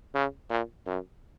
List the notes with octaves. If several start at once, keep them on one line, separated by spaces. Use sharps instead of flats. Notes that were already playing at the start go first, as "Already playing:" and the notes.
C#3
A#2
F#2